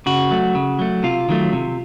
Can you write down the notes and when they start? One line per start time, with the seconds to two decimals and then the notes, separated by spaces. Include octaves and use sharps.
0.06 C#3 F#4
0.31 F#3 A3
0.55 C#3
0.79 F#3 A3
1.03 C3 F4
1.29 D#3 F#3 A3
1.53 C3